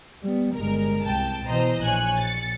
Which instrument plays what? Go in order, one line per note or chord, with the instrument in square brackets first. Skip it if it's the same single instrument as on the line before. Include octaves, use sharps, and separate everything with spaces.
[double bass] G3 B3
[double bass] G1 G#3 [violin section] A#4
[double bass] C2 [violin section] G5 A5
[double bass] B2 E3 [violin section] C5 D#5 A#5
[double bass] A#1 [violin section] C#5 G#5 F#6
[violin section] A6 C#7